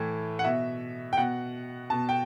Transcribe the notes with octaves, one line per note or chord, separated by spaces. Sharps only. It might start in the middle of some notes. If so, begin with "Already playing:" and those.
Already playing: A2 E3
F#5
B2 E5
G5
B2 F#5
B2 A5
G5